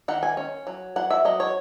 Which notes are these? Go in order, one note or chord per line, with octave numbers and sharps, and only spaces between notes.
D#3 F#5
G#5
C#4
F#3
F#3 F#5
E5
F#3 D#5
C#5